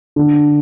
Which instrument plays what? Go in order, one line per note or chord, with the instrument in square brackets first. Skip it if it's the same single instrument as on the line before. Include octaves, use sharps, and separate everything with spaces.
[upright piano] D3